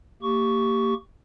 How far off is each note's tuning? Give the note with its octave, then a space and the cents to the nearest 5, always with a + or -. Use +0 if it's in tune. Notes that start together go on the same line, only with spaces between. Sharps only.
A#3 -25 G4 +0 C#6 +10